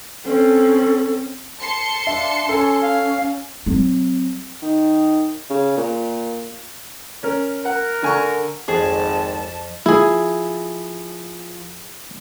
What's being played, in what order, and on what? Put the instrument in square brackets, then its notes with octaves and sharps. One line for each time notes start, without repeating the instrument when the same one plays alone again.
[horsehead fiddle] C4 C#4 [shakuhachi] A4
[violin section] A5 C6 C#7
[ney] D4 [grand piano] E5 F5
[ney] C#4 [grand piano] A4 G#5
[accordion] F5
[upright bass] F#3 C4
[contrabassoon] D#3
C#3
A#2
[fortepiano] C#4 A#4
[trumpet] A#4 [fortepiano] F#5
[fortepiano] D3 G#5 C#6
[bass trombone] G#1 [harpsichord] F2 [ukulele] G#4 [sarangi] A5
[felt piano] F3 [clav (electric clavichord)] E4 G#4